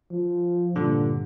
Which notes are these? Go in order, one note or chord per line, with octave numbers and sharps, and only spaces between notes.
F3
G2 A#2 D3